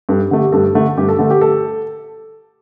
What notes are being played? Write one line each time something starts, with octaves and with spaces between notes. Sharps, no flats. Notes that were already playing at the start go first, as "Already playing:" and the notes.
G2 A4
D3 A3
G4
G2 A4
D3 A3
G2 G4
A4
D3 A3 A4
G4
A4